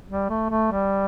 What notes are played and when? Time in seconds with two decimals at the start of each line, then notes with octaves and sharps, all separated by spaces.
0.08 G3
0.29 A3
0.50 A3
0.71 G3